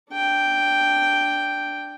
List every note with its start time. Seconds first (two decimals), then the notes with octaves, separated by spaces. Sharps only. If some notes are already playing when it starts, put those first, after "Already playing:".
0.11 D4 G5